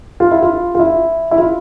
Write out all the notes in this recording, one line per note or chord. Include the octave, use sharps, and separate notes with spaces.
F4
E4
F4
F4
E4
E4
F4